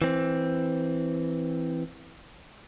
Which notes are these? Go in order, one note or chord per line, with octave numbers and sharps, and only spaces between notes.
E3 C4